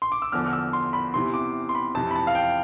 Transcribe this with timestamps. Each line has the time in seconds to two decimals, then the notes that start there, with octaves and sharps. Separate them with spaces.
0.02 C6
0.12 D6
0.22 E6
0.32 E2 D3 F3 F6
0.46 F6
0.53 E6
0.73 C6
0.93 B5
1.14 E2 C3 E3 C6
1.34 D6
1.69 C6
1.75 B5
1.95 F2 C3 E3 A5
2.11 B5
2.15 A5
2.27 F5
2.35 G5